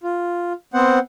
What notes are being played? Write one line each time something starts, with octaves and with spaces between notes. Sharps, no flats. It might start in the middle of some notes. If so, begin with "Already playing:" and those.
F4
B3 C4 C5 F#5